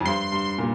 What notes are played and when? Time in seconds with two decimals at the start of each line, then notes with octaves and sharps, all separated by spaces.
0.01 F2
0.05 G2 C6
0.32 G2
0.58 A#2